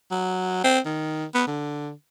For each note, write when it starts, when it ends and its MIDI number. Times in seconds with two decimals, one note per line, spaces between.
0.11 0.60 54
0.64 0.79 60
0.85 1.25 51
1.35 1.45 59
1.47 1.91 50